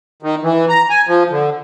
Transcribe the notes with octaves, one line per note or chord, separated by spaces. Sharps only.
D#3
E3
A#5
G#5
F3
D3